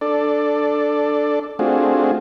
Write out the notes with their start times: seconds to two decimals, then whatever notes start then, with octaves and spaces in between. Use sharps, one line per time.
0.01 D4 A4 D5
1.59 A3 C4 D4 F4 F#4 G#4